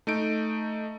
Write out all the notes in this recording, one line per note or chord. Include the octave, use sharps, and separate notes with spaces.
A3 D#4 D7